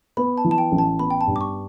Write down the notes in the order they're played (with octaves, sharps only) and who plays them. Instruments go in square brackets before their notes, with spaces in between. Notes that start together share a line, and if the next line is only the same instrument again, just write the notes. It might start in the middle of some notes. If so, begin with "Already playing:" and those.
[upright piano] B3 [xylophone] B5
[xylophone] A5
[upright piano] E3
[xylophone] A5
G5
[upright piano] A1
[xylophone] A5
[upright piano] B3 [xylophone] B5
[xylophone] G5
A5
[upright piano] G2
[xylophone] D6
C#6